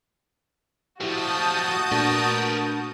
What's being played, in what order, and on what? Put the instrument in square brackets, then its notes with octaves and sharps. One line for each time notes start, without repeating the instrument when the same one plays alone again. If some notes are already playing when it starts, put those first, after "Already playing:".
[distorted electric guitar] A2 F3 [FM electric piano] E4 G4 [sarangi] F#4 [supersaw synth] A5 D#6 G6
[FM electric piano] A#2 A3 D4 [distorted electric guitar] A#4 B4